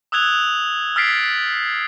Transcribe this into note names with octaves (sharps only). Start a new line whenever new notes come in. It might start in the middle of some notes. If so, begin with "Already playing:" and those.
D#6 E6 F#6 G#6 F7
E6 F6 A6 B6 C7 D7